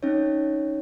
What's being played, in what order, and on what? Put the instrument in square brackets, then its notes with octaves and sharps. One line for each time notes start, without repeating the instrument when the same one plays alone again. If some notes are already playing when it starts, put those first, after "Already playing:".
[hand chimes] C4 C#4 D#4 C#5